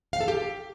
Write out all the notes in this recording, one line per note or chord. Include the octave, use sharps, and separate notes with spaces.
F5
A4
G4